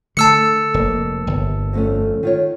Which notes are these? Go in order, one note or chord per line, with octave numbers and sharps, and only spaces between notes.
D3 A3 A5 E6 C#7
F1 A#3
G1
F2 A3 C#4
D#3 F4 C#5